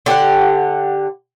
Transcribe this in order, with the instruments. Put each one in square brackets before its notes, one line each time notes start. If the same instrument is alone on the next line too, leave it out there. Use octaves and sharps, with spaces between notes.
[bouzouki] D3 G4 C#5 F#5